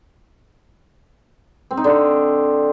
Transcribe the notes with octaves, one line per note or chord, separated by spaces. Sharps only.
C4
D#4
D3